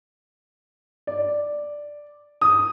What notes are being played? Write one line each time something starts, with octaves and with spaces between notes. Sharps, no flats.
D5
D#6